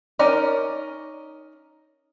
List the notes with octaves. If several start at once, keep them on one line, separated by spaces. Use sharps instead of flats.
C#4 D#4 A#4 D5 D#5